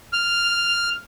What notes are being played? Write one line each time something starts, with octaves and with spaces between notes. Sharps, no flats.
F6